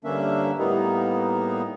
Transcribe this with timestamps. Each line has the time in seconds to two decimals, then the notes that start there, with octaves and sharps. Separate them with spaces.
0.04 G2 D3 A#3 C#4 D4 E5
0.59 A2 G3 A#3 B3 D#4